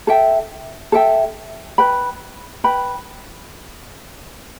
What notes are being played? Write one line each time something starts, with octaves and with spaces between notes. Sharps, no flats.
A4 E5 G5
A4 E5 G5
B4 G5 B5
B4 G5 B5